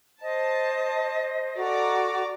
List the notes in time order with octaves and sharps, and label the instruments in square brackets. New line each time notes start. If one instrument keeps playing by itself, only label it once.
[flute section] C5 [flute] D#5 [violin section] A5
[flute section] F#4 A4 [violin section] D5 A#5 D6